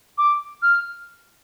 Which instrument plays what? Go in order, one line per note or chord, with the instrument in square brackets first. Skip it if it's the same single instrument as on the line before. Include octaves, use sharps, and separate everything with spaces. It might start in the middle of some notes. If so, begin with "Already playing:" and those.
[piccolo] D6
F6